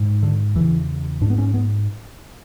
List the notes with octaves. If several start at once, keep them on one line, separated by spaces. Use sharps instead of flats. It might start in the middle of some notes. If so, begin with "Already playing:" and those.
Already playing: G#2
D3
E2 C#3 E3
G#2 D4
B3
C#4
B3